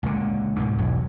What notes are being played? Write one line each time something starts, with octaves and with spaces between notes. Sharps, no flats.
C#2 A#2 D3
G#2 B2 D3
E1 B1 E2